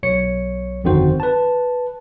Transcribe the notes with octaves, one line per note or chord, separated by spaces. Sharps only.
B1 C#5 C#7
G1 F2 D#3 C4 F#4 C5
B4 A5